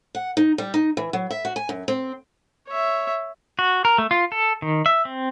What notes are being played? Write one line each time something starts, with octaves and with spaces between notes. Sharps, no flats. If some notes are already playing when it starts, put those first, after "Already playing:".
F#5
D#4
G3
D#4
E3
F#3
E5
F#4
G#5
F#2
C4
C#5 E5
F#4
A#4
A3
F4
A4
D#3
E5
C4